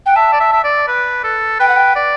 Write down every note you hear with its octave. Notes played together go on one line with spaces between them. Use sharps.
F#5 G5
E5 A5
D5
E5
E5
D5
B4
A4
B4 G5
F#5
G5
D5